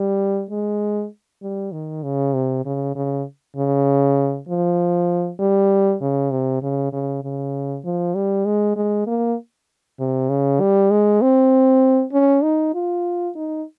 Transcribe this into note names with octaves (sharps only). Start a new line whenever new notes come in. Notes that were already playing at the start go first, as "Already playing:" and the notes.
Already playing: G3
G#3
G3
D#3
C#3
C3
C#3
C#3
C#3
F3
G3
C#3
C3
C#3
C#3
C#3
F3
G3
G#3
G#3
A#3
C3
C#3
G3
G#3
C4
C#4
D#4
F4
D#4